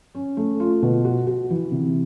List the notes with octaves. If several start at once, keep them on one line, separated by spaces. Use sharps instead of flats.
C#4
A3
F4
B2
F#4
F#4
E3
C3